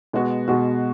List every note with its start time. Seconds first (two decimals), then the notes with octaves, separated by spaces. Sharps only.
0.13 B2 G#3 B3 F#4
0.48 B2 G#3 B3 F#4